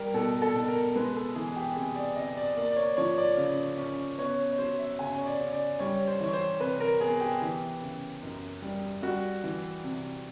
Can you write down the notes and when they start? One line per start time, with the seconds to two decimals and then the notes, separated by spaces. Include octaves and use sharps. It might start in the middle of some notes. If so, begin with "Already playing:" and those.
Already playing: G3 C4 G4 A#4
0.14 B2 A4
0.42 A4
0.55 B2
0.68 A#4
0.96 G#3 B4
1.15 A4
1.35 E3 G#4
1.56 G4
1.76 C3 G#4
1.96 D5
2.16 C3 D#5
2.37 D5
2.57 A#3 D5
2.72 D5
2.76 C#5
2.97 F3 C#5
3.18 D5
3.37 C#3
3.78 C#4
4.18 B3 C#5
4.52 C#5
4.58 F#3 C5
4.79 E5
4.99 C#3 G#5
5.18 C#5
5.26 D5
5.40 C#3
5.53 D5
5.79 G3 C#5
6.07 C5
6.20 E3 C#5
6.33 C5
6.60 C3 B4
6.80 A#4
7.00 B3 G#4
7.21 G4
7.41 E3
7.82 C#3
8.22 F#2
8.62 G3
9.02 G3 F#4
9.44 E3
9.84 C3